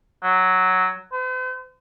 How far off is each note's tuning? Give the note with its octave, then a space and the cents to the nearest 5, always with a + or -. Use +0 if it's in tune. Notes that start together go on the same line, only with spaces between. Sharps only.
F#3 +5
C5 -45